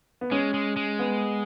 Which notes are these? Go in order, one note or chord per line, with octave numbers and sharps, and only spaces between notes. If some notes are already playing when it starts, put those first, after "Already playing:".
B3
G#3 C#4
G#3
G#3
B3